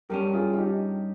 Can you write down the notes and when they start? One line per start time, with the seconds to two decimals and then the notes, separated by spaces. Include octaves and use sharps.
0.09 G2 G3 C#4 G4 A#4
0.34 F4 G#4
0.53 F4
0.58 D#4 G4